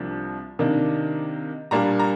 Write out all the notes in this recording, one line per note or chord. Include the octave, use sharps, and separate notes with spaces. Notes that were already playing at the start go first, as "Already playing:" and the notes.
Already playing: C2 C3 F3 A#3 D4
C3 D#3 A#3 D4
A#2 G3 A#3 D4 A#5
A#5